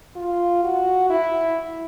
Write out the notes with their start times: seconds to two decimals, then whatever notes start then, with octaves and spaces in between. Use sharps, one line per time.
0.16 F4
0.64 F#4
1.10 E4